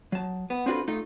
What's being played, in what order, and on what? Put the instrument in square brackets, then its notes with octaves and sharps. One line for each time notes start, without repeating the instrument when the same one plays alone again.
[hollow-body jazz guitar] F#3 A5
B3
C4 D4 F4 F#4 A4 B4
A3 D#4 F4